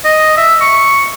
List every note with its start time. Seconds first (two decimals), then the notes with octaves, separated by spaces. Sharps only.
0.05 D#5
0.37 E5
0.61 C#6